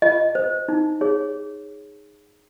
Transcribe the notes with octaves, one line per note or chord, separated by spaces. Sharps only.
F4 D#5
C5
D#4
G#4 C#5